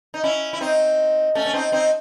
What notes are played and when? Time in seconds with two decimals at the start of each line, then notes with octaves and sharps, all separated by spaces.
0.14 D#4
0.24 C#4 E4
0.53 E4
0.61 C4 D#4
1.35 A3 C#4
1.46 C#4
1.53 C4 D#4
1.72 C4 D#4